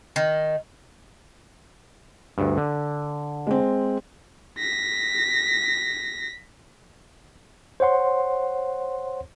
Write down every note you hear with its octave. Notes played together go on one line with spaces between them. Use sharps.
D#3
D2 G2
D3
G#3 C4
A#6 B6
C5 C#5 F#5 C6